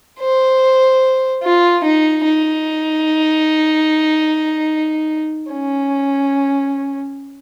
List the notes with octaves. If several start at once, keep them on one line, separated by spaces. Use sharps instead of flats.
C5
F4
D#4
D#4
C#4